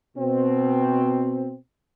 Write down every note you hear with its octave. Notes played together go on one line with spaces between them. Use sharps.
B2 C4